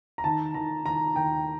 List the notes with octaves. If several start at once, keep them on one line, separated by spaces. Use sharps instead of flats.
A#5
D#3 A5
D#3 A#5
D#3 A#5
D#2 G5